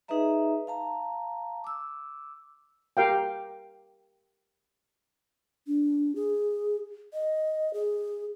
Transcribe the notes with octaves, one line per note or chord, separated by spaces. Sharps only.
D#4 G#4 B4 D#5 E5 A#5
F5 A5 A#5
D6 E6
G4 A#4 F5 G5
D4
G#4
D#5
G#4